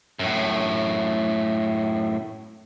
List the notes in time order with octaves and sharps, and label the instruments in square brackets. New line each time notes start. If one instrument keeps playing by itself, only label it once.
[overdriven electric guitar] F#2 A2